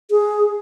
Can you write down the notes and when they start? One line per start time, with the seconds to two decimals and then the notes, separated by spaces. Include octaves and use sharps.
0.11 G#4